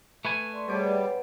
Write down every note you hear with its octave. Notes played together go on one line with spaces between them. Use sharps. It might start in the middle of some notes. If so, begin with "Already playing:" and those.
A3 B4 G#5
D5 C6 C#6
B2 G3 G#4 C5 C#5 G5 D6
C#5